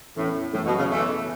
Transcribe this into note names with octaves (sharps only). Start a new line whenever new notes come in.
E2 A2 E3 C#4 A4
F#2 A2 E3 A3
B2
C#3
B2 E3 A3 B3 A4 E5